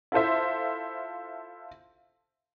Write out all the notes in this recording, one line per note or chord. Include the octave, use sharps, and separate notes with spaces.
E4 F4 A4 C5 E5